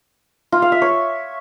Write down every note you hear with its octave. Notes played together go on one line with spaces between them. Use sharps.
F4
F5
E5
C#5